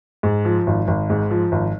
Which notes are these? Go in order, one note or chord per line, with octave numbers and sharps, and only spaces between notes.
G#2
F3
G#1
G#1
G#2
F3
G#1